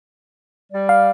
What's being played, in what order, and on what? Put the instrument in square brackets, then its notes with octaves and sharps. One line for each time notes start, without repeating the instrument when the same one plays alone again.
[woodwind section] G3 D5
[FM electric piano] F5